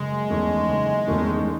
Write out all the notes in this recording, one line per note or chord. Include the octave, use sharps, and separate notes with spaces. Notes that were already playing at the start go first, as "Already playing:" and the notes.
Already playing: F#1 G#3
E2 D#3 A3 C#4
F#1
E2 D#3 A3 C#4